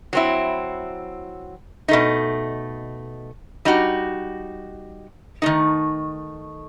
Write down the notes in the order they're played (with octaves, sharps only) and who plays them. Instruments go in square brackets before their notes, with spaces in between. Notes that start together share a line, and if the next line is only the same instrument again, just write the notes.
[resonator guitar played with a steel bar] F#3 C4 E4
B2 A3 D#4
G3 D#4 F#4
D#3 A3 D#4